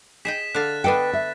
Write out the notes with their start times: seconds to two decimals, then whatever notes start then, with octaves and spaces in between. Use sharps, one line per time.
0.25 G#4 D#5 G5 B6 E7
0.55 D3 F5 F#6 A6
0.84 B3 D4 A4 B4 D#5 G5
1.13 E5